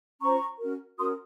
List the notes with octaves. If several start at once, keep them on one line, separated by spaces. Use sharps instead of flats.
C#4 F4 C5 A#5 C#6
C#4 F#4 A#4
C#4 F#4 A#4 C6 D#6